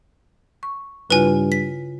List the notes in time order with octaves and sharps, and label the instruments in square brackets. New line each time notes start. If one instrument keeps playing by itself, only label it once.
[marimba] C#6
[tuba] G2 [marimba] C#3 E4 F4 [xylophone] B4 G#5
[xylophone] B6